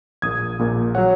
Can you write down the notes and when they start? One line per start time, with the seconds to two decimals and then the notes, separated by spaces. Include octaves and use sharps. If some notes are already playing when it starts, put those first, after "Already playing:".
0.22 A#1 A#2 A#3 D#6 G#6
0.59 A#1 A#2 A#3
0.95 F#3 C#5 F#5